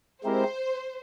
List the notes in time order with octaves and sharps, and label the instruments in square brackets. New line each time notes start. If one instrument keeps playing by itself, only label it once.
[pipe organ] G#3 C4 E4 G4 A#4 [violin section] C5